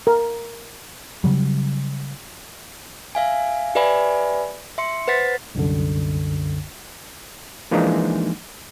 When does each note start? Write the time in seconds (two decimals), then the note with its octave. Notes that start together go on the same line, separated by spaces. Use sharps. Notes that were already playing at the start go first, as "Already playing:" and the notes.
0.07 A#4
1.24 C#3 F#3 G3
3.15 E5 F5 G#5
3.75 G4 B4 D5 E5 G#5 B5
4.78 E5 C6 C#7
5.07 B4 C5 F#5 A6 B6
5.55 C2 F#2 D3
7.71 E3 F3 G#3 A#3 D4 D#4